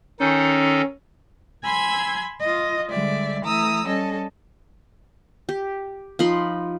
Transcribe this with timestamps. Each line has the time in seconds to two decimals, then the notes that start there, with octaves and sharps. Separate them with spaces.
0.20 D#3 C#4 D#4 A4
1.64 G#5 B5 C6 E6 G#6
2.41 F4 D#5
2.89 D3 G3 G#3 D5 E5
3.44 E3 A3 A#5 D#6 E6
3.86 G3 C#4 A4 D#5
5.49 G4
6.19 F3 D#4 B5 C6